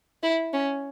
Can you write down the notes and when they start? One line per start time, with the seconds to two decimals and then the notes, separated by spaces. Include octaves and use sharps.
0.23 E4
0.53 C#4